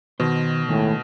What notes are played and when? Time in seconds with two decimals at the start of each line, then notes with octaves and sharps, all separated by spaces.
0.20 B2 D#3 C5
0.69 A2 D#3 G#3 A3